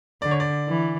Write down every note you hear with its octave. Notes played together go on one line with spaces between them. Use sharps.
D3 D5
C#5
D5
E3